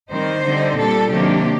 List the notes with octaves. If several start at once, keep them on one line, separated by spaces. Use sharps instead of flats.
D#3 G3 C4 D#4 C5
D3 G3 C4 D#4
A#2 G3 D4 A4
C3 D#3 F#3 A#3 D4 G4